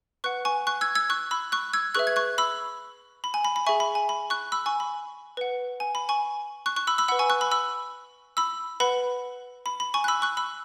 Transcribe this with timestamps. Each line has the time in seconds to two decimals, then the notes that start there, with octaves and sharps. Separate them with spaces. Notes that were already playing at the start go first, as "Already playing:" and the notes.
0.24 B4 F#5 C#6 F#6
0.45 G#5 C#6
0.67 C#6 F#6
0.81 E6 G#6
0.95 E6 G#6
1.10 C#6 F#6
1.31 B5 E6
1.52 C#6 F#6
1.73 E6 G#6
1.95 G#4 B4 E5 C#6 F#6
2.07 G#6
2.16 C#6 F#6
2.38 B5 E6
3.24 B5
3.34 G#5
3.45 B5
3.56 B5
3.66 G#4 E5 G#5 C#6
3.80 B5
3.95 G#5
4.09 B5
4.30 C#6 F#6
4.52 B5 E6
4.66 G#5 C#6
4.80 B5
5.37 B4 F#5
5.80 G#5
5.95 B5
6.09 G#5 C#6
6.66 C#6 F#6
6.76 C#6 F#6
6.87 B5 E6
6.98 B5 E6
7.08 B4 F#5 B5 E6
7.19 G#5 C#6
7.30 C#6 F#6
7.41 B5 E6
7.51 B5 E6
8.37 B5 E6
8.80 B4 F#5 B5
9.66 B5
9.80 B5
9.94 G#5 C#6
10.04 F#6
10.08 B5 E6
10.22 C#6 F#6
10.37 B5 E6